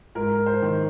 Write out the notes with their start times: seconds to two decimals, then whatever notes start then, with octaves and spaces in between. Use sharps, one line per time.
0.15 G#2 A#4
0.46 C5
0.62 D#3